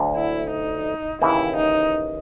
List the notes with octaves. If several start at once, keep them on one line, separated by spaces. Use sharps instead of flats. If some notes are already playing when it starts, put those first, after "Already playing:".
Already playing: D2 D3 F#3
E4
D#4
D#2 C#3 E3 E4
D#4